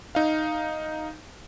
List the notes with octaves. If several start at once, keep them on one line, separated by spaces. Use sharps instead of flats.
D#4 F5